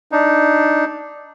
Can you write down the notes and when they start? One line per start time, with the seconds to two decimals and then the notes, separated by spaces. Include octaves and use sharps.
0.12 D4 D#4